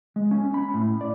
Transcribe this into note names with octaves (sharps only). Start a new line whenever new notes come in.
G#3
C#4
B5
A2
D5